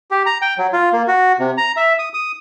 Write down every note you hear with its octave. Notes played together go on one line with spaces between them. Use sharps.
G4
A#5
G5
F#3
F4
A#3
F#4
C3
A#5
E5
D#6
D#6